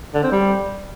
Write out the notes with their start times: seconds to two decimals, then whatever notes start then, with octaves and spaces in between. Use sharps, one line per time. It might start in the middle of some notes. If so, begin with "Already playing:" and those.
0.14 D3
0.23 C4
0.32 G3